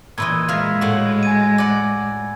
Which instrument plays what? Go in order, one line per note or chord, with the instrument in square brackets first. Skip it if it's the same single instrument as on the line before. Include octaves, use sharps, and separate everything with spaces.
[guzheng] A#2 E3 D#5 [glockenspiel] B5 E6 G#6
[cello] G#3 [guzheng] E5 F5
[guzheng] A2 F#4
[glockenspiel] G#5 G#6 D#7
[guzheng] D5 F#5